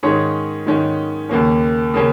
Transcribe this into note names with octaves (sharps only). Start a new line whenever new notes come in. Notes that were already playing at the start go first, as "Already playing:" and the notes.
G#2 D#3 C#4 G#4 C#5
G#2 D#3 C#4
D#2 C#3 A#3 C#4
C#3 A#3 C#4